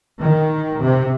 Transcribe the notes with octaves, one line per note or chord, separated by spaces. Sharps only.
D#3
C3